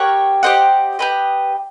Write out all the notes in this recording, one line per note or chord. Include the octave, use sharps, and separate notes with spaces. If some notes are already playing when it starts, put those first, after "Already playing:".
Already playing: G4 A#4 C#5 F#5
G4 C5 D#5 F#5
G4 B4 D#5